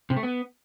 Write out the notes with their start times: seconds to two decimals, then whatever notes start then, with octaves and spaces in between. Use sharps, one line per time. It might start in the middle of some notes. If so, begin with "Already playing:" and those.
0.10 C3
0.16 A3
0.23 B3